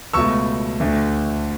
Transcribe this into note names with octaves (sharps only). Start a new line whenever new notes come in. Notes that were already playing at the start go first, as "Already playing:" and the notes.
C#2 B2 A3 C#6 E6
D2 D3 A3